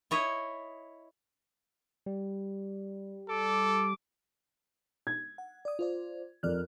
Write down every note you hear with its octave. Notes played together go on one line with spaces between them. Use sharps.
E4 C#5 D#5
G3
A4 D6
G#6
F#5
D5 D#6
F4 C5 D5
F2 A#4 D5 F6 F#6